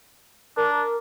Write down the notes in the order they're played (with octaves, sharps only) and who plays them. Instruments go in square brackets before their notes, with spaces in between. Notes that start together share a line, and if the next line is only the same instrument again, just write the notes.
[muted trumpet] D4 [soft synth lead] A#4